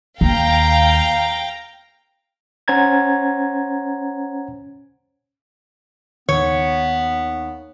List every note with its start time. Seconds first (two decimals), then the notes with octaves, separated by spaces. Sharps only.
0.21 D#2 F5 G5 A#5
2.68 C#4 C5 F#5 A#5 G#6 A6
6.29 D#2 B3 C#5